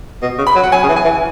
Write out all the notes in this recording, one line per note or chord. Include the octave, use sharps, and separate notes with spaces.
B2
C#3
B5
F#3
F#5
F#3 G#5
C#3
E3
G#5
E3